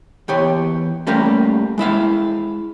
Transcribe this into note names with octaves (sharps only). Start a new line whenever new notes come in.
E2 G4 C#5
G3 A3 A#3 C#4 G4
G#3 E4 E5 F5